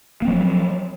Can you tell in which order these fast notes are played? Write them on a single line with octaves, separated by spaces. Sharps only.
A#3 C4 F3 F#3